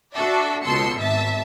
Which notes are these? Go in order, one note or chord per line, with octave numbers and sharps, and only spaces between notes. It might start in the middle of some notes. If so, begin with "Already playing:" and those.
D4 F#4 A4 D5 E5
C#2 B2 A4 C6 E6 C#7
G#1 E5 A5